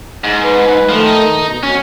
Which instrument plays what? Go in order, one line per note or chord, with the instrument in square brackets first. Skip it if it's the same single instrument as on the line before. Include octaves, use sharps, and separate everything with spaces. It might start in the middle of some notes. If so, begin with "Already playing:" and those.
[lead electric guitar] G#2
[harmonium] B4
[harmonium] D#3 A3 [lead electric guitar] F3
[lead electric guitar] D#4
[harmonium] B2
[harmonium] F#3 [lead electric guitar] C#4